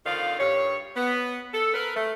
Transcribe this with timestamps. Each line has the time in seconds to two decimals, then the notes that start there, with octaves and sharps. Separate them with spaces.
0.05 F2 D3 D#3 F4 D5 F5
0.39 G2 C#5
0.96 B3
1.53 A4
1.74 A#4 B4
1.95 A3